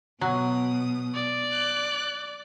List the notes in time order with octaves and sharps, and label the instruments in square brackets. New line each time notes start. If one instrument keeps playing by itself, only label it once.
[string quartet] B2 D#6 [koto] F#3
[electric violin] D5
[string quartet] F#6